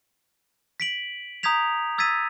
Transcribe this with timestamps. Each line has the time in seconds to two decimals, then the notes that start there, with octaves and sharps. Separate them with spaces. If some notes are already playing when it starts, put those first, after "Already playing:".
0.80 B6 D7 F#7
1.43 A#5 D#6 G6 G#6 B6 F7
1.98 D#6 E6 G#6 A6 B6 D#7